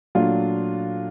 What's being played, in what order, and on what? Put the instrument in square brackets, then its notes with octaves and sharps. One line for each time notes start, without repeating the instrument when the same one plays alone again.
[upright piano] A#2 F#3 A3 D4 F4